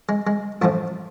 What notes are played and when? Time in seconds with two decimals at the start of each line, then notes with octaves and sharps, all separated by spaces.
0.09 G#3
0.27 G#3
0.62 A1 A2 F3 A3